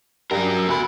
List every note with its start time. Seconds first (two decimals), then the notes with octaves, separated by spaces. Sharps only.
0.31 G2 F#3 D4 G4 A#4
0.57 E6
0.69 D2 F#4 B5